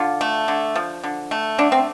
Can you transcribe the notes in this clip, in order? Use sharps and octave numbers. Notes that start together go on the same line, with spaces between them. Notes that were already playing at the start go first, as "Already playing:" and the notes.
Already playing: D3 F4
A3
D3
F3
D3
A3
D3 D4
C4